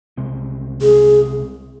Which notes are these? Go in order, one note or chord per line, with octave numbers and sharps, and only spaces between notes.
C2 C3 G#3 C4
C2 C3 G#3 C4 G#4